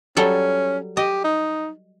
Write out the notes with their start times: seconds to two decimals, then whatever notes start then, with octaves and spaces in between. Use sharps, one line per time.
0.17 F#3 G3 C#4 A4
0.97 G4 D#5
1.24 D#4